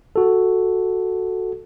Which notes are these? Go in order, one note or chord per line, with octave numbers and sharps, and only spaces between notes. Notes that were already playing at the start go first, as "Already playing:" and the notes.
F#4 A4